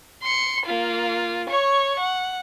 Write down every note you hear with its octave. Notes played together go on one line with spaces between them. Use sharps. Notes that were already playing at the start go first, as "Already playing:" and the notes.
C6 C#7
A#3 F4
C#5 C#6
F#5